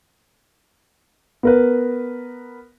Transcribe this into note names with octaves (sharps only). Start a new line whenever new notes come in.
B3 A#4 B4